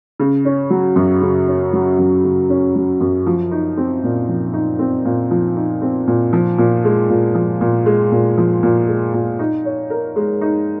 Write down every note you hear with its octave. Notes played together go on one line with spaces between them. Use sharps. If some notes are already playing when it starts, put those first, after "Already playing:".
C#3
C#4
F#3
F#2
C#3
C#4
F#3
F#2
C#3
C#4
F#3
F#2
F3
D#4
C4
A#2
F3
D#4
C4
A#2
F3
D#4
C4
A#2
F3
A#2
G#3
A#2
F3
A#2
G#3
A#2
F3
A#2
G#3
A#2
D#4
C#5
A#4
G#3
D#4